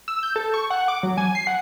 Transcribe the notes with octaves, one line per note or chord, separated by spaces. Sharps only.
E6
G6
A4
C#6
F#5
D6
F#3
G#5
C7
F#5